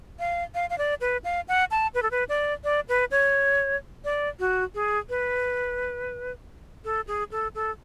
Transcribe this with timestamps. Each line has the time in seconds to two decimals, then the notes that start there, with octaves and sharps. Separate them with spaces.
0.19 F5
0.55 F5
0.70 F5
0.78 D5
1.01 B4
1.24 F5
1.48 F#5
1.71 A5
1.95 B4
2.03 A4
2.11 B4
2.29 D5
2.64 D5
2.89 B4
3.11 C#5
4.04 D5
4.40 F#4
4.75 G#4
5.09 B4
6.85 A4
7.07 G#4
7.32 A4
7.55 A4